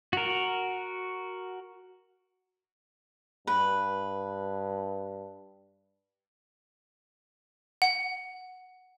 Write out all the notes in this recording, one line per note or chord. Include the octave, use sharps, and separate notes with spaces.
F#4 A#4
G2 B4
F#5